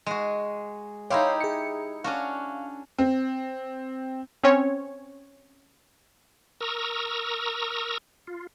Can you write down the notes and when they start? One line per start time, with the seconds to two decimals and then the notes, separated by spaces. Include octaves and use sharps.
0.06 G#3 F#4
1.10 D#4 E4 G4 C#5 F5 C6
1.40 G#4 C#7
2.04 C#4 D4 F#4 F5
2.98 C4
4.43 C4 C#4 C#5
6.61 A#4 A#5 C#6 D#6 E6
8.27 F4